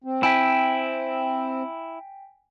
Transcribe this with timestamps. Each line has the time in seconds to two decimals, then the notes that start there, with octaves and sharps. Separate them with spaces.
0.04 C4
0.23 E4 G5 G#5 B6